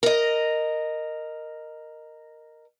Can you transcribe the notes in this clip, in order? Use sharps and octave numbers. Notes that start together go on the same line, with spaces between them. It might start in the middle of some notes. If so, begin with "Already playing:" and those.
A#4 D#5